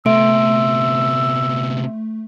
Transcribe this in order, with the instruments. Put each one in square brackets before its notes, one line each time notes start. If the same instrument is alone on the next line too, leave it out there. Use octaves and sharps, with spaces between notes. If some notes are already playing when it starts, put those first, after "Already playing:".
[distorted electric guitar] C3 B3 [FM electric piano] A3 [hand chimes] E5 C6 D7 [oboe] E6